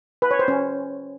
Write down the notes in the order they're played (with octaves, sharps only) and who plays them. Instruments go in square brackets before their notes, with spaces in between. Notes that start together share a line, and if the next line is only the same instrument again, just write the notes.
[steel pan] B4
C#5
C5
C#4